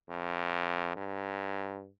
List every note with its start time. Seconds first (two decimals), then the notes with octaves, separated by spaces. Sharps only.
0.09 F2
0.96 G2